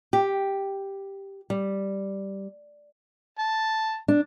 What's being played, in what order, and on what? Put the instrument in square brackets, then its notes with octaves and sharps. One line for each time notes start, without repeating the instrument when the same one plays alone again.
[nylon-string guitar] G4
G3
[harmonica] A5
[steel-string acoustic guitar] D4